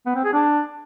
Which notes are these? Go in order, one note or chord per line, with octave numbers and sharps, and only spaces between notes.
B3
C4
G#4
D4